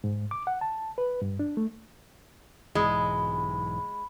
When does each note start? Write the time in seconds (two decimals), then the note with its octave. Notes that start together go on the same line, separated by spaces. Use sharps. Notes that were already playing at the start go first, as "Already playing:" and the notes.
0.04 G#2
0.31 D6
0.47 F#5
0.61 A5
0.98 B4
1.22 G2
1.39 D4
1.57 A3
2.75 B1 G#2 E3 G#3 B5